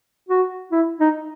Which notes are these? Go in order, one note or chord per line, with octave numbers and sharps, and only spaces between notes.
F#4
E4
D#4